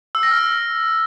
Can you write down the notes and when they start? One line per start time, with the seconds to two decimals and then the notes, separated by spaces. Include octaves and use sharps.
0.15 E6
0.23 A#6
0.31 F6